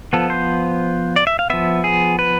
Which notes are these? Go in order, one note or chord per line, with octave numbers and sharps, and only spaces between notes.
F3 B3 A4
C5
D5
E5
F5
F3 B3 E5
G#4
B4